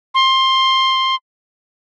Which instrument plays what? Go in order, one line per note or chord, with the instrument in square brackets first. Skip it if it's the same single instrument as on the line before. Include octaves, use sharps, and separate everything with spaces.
[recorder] C6